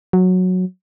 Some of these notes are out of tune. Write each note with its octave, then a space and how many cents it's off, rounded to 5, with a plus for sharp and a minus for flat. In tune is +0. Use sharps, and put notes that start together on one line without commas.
F#3 -10